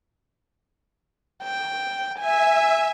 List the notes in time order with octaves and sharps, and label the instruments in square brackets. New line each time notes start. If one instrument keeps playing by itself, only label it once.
[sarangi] G5
[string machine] E5 [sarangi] G#5